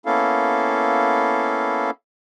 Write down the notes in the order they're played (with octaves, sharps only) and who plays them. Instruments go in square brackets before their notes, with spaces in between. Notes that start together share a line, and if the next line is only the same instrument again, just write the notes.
[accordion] A#3 B3 C#4 E4 A4 F5